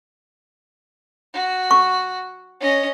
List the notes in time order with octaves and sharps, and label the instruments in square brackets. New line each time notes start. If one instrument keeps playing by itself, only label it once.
[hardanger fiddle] F#4
[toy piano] C#6
[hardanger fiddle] C#4 D#5